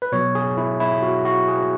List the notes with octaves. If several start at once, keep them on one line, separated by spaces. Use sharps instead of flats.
B4
B2 F#3 C#5
G#4
E4
E4
F#4
F#4
G#4